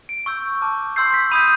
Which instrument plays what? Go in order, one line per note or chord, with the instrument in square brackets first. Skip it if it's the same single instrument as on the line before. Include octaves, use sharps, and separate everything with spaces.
[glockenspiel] D7
C#6 E6 G6
A5 D6 F6
C6 E6 G6 C7
B6
B5 D#6 G6 D#7